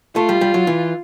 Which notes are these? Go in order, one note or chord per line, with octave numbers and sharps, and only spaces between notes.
A3 F4
G3
G3
F#3
E3